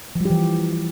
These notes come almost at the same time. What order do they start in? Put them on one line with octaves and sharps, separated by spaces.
F3 G3 G4 E3